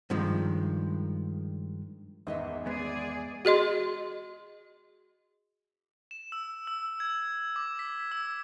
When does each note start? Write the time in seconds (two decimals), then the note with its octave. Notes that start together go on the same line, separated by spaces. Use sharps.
0.10 G2 D#3 F3 G#3
2.27 G#1 E2 D#5 E5
2.66 G#3 B3 G#4 D5
3.45 F#4 G#4 D#5 C6
6.11 E7
6.32 E6
6.67 E6
7.00 G#6
7.56 D6
7.79 B6
8.12 E6